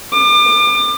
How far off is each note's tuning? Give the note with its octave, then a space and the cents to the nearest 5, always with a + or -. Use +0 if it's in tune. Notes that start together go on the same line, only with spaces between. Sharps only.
D6 +35